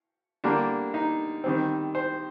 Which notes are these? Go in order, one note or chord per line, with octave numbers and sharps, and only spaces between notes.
D3 G3 A#3 D4
D#4
D#3 G3 C4
C5